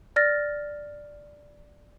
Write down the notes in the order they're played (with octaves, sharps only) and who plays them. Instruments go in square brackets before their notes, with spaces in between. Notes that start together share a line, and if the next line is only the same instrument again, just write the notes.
[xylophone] D5 F6 A6 A#6